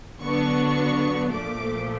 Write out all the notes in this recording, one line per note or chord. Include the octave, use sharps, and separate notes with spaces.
D3 F#3 B3 D4 C#6
A#2 F3 A3 D6